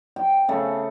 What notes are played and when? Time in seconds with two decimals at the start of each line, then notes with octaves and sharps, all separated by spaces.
0.16 G5
0.49 C#3 A3